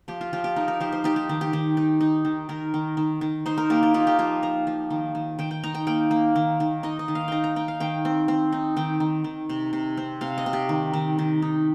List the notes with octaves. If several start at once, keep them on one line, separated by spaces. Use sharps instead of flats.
F3 G4
F4
F3 G4
G4
D#4 A#4
A#4
F3 G4
C5
D#4 G4
G4
D#3
G4
D#3
D#4
D#4
D#3
D#3 A#4
D#3
D#3
D#3
D#4 C5
A#4
A#3 G4
G4
D#4 F4
G4
F3 F4
F3 A#5
F3
D#3
D#3
D#3 G5
G5
D#4 A#5
G5
A#3 G5
A#3
D#3
D#3
D#4 D#5
D#5
D#3
F5
D#4 G5 A#5
A#5
D#4 G5
F5
D#3 G5
C4
C4
D#4
D#3 G5
D#3
D#3
C3
C3
C4
C3 F5
D#5
C3
G4
D#3
D#3
D#3
D#4